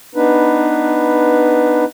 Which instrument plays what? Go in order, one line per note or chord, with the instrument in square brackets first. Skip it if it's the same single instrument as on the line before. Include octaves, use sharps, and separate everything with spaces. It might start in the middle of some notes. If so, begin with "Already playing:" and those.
[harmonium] B3 D4 D#4 B4